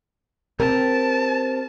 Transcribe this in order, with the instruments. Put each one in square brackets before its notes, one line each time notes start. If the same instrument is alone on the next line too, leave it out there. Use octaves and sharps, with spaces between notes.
[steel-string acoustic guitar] C4 G4 A#4 [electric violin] A5